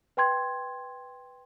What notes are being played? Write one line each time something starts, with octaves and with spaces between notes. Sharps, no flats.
B4 G5 C6 G#6